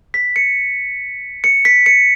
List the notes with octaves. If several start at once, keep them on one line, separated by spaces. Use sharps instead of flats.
B6
C#7
C#7
B6
C#7